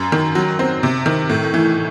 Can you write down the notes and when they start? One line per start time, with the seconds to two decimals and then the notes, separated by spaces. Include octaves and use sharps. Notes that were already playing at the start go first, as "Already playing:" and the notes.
Already playing: F#2
0.12 D#3
0.35 F#3
0.59 C4
0.83 C3
1.06 D#3
1.29 A2
1.54 E3